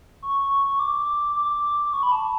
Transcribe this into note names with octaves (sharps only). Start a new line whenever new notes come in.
C#6
D6
D6
D6
C#6
B5
A5